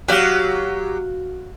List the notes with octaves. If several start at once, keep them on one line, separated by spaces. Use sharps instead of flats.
F#3 F#4 G4 F5